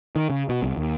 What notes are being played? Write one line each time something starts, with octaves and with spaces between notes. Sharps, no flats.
D#3
C#3
B2
C2
D#2